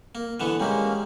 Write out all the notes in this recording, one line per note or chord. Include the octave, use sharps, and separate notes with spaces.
A#3
D3 E3 B3
G3 G#3 A#3 C#4